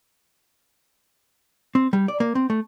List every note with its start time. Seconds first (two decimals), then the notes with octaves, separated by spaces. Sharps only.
1.75 C4
1.93 G3
2.08 D5
2.20 A#3
2.35 C4
2.50 A3